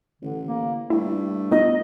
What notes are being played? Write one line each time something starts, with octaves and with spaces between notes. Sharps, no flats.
A1 D3
A#3
G2 A3 E4 G4
B3 D#4 F4 D#5